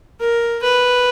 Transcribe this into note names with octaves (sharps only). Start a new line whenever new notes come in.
A#4
B4